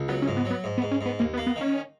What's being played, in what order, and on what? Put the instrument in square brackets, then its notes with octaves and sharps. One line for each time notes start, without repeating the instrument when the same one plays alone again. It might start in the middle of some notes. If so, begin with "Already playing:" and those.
Already playing: [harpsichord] C#2
[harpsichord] F#3 [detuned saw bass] B3
[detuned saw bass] C#4
[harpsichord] G#2
[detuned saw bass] B3
[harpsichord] F#3
[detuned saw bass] B3
[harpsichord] G#2
[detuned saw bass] B3
[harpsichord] G#2
[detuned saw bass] C#4
[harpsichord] G#2 [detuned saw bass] B3
[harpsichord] D#2 [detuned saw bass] A#3
[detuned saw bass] B3
[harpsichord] A#3
[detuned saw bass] B3
[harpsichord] D#3 [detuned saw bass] C#4